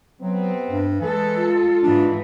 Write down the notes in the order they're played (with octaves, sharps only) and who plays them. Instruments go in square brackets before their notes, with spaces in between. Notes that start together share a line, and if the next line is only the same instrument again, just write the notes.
[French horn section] C3 B3 C4 [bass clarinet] F#3
[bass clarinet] G2
[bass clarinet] E3 [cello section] G#3 A4
[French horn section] F4
[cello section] G#2 E3 [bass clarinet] D4